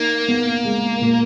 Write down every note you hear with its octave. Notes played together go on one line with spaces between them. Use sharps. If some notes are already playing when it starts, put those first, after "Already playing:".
Already playing: A#3 D#4
B3
G#3
A#2